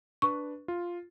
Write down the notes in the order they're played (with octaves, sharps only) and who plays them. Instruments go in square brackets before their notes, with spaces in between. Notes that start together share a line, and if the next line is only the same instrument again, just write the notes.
[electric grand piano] D4 B4 [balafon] C#6
[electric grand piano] F4